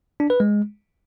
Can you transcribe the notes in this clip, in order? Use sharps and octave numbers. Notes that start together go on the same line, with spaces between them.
D4
B4
G#3